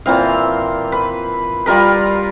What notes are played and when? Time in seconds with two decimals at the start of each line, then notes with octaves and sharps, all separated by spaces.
0.06 A#2 E3 C4 F5
0.92 B4
1.66 G3 F4 A#4 B4